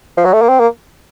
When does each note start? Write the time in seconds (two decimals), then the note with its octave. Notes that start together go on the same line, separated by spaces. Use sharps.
0.17 F3
0.25 F#3
0.33 A3
0.42 A#3
0.49 C4
0.60 A#3